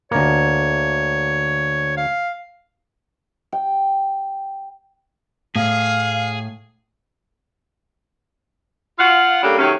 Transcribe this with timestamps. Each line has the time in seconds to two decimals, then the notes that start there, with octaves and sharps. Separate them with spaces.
0.11 D2 A#3 C#5
1.97 F5
3.52 G5
5.56 A2 G#4 F5
8.98 F4 F5 F#5
9.42 G3 A#3 C#4 D4 G4 A4
9.58 C3 D#3 F#3 A3 C#4